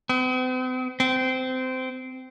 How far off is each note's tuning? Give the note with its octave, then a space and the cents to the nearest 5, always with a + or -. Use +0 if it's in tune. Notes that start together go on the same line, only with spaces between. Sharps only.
C4 -45
C4 -20